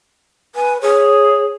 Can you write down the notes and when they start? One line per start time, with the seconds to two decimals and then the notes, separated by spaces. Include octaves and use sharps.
0.55 B4 G#5
0.82 G#4 C#5